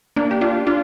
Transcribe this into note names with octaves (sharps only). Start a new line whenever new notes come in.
A#3 D4
G4
D4 F4
D4 F4